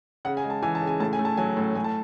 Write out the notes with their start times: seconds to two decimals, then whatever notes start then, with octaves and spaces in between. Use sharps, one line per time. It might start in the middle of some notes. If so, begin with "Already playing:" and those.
0.25 C#3 F#5
0.37 G#5
0.44 G#3
0.50 A5
0.63 E3 G#5
0.75 A5
0.82 C#3
0.87 G#5
1.00 A2 A5
1.13 G#5
1.19 A3
1.25 A5
1.37 F#3 G#5
1.57 A2
1.75 A2 G#5
1.84 A5